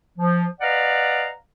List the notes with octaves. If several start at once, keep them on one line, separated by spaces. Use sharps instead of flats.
F3
B4 D5 D#5 F5 F#5 A#5